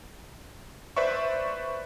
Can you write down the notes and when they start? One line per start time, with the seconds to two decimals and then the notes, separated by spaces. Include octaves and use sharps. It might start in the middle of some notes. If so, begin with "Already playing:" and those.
0.96 B4 C5 D5 E5 C#6